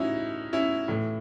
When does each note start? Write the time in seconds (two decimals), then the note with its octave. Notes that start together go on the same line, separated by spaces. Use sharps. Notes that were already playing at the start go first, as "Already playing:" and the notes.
Already playing: A2 E3 C#4 D#4 E4 F#4
0.53 C#4 E4
0.88 A2 E3